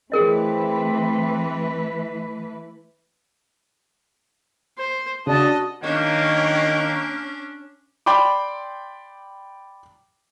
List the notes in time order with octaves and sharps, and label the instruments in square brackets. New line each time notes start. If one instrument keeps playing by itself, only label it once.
[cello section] E3 A3 B4 [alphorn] C4 [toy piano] G#4 A#4 D#5
[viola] C5
[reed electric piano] C#3 [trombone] D4 [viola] F#4 D#5 [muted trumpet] A5
[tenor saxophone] D#3 [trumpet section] A#3 [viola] C#4 D4 [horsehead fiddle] C#5 G5
[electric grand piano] D5 G5 B5 C6 D6